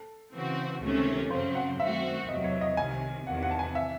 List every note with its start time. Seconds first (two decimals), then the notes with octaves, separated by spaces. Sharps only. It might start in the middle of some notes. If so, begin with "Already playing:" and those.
Already playing: A4
0.33 C#3 E3 C4 F#4
0.81 C#2 C3 D#3 A3 C#4
1.30 F#2 C#3 F#3 C4 C5
1.55 F#5
1.80 F#2 D#3 A3 C4 F#4 E5
2.28 E2 C3 F#3 D#5
2.44 C#5
2.61 D#5
2.77 C2 C3 D#3 G#5
3.26 E2 C3 D#3 F#5
3.43 F#5
3.51 A5
3.59 G#5
3.75 E5